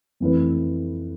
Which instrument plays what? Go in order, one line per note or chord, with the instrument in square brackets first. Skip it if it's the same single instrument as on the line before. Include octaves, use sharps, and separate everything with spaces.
[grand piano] F2 E3 A3 E4 B4